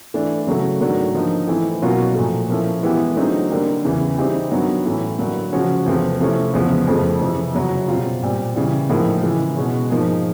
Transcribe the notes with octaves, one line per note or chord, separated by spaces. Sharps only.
E3 A3 D4
C#3 F#3 A3
G#2 D#3 F#3 A3 D4
D3 F3 A#3 D#4
E3 A3 C4 E4
B2 F#3 A#3 C#4 F4
A#2 F3 A3
F3 A#3 C#4 E4 A4
E3 G#3 B3 E4 G4
D3 F#3 A3 C4 D#4
D3 G3 A#3
E2 C#3 E3
E3 G3 C4 D#4 G4
G2 D#3 F#3 B3
A2 E3 A3 C#4
G2 D3 F#3 A#3
C#3 F3 G#3 C#4 F#4
E2 C3 F3 A3 C4
C3 F3 A3 C#4 E4
E2 C#3 F3 G#3 B3
F2 C#3 F3 A3
F2 C3 E3
F#2 C#3 F#3
B2 G3 C4 F4
A#2 G3 C4
C#3 E3 G3
A2 F3 A#3 D#4 G#4
C#3 E3 G#3
B2 G#3 C#4
G#2 F3 A#3 D#4 G#4